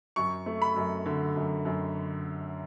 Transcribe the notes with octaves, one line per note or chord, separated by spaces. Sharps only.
F#2 C#6
A3
B5
F#2
D3
F#2
F#2